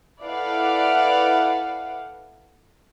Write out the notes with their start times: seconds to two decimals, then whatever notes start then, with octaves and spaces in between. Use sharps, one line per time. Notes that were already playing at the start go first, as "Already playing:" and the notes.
0.23 E4 A4 B4 D5 F5 F#5